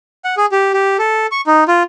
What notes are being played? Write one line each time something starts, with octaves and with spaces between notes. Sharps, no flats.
F#5
G#4
G4
G4
A4
C#6
D#4
F4